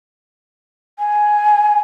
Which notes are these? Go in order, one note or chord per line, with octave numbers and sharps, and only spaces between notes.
G#5